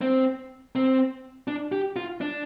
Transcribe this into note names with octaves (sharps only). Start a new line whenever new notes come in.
C4
C4
D4
G4
F4
D4